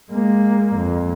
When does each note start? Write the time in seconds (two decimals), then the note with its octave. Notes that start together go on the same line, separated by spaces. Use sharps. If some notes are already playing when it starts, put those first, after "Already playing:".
0.12 G#3 A#3
0.76 F2